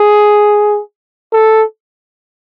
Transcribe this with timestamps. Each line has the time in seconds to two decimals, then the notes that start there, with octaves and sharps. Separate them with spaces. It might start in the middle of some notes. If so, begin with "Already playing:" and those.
Already playing: G#4
1.33 A4